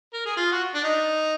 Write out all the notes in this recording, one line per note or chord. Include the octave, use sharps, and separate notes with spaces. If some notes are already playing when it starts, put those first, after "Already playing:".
A#4
G#4
F4
F#4
D4
D#4